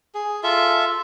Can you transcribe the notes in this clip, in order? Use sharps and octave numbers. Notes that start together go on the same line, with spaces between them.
G#4
F4 A4 E5